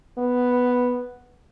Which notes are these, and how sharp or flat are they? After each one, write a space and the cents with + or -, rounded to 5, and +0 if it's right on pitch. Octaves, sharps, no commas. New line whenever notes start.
B3 +0